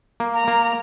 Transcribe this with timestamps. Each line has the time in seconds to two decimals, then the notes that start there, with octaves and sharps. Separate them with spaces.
0.20 A#3
0.34 A#5
0.48 A#3